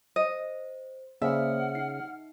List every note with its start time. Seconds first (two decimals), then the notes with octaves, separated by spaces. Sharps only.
0.16 C5 D#5
1.22 C#3 A#3 C5 D5 E5 F#5 F6
1.75 D#4 C7